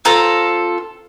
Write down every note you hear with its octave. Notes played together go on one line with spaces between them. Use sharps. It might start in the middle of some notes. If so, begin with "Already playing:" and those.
C4 F4 A4 A#5